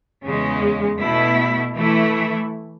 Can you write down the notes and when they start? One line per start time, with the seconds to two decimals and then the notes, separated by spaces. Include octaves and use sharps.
0.23 E2 C#3 G#3
0.97 B2 A3 E4
1.73 E3 A3 E4